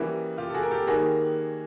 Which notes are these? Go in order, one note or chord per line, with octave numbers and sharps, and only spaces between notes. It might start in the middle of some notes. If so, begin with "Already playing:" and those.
Already playing: C#3 E3 G3 A#3 E4 F#4
F4 G4
A4
F#4 G#4
A#4
G4 A4
D#3 G3 A#3 F#4 G#4